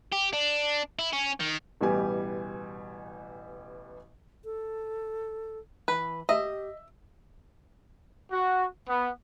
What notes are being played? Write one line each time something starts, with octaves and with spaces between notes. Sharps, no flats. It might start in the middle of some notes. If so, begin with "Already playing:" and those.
G4
D4
E4
C#4
D#3
A1 B2 E3 G3 G4 G#5
A4
E3 B4
G4 D#5 E5
F#4
B3